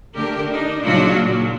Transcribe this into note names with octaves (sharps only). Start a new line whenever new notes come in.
D3 A3 G4 A#4
D4 D#4
A#2 C#3 F#3 D4 F4 F#4
A#2